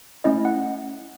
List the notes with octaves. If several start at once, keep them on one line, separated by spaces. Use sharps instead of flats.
A3 C#4 E4 D#5
F#5